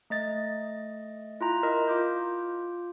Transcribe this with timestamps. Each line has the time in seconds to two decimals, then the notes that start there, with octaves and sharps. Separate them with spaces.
0.10 A3 D#5 A6
1.41 E4 F4 A#5
1.63 E4 A#4 D#5
1.87 F4 D6 G6